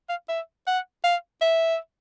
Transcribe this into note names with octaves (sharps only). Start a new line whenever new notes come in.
F5
E5
F#5
F5
E5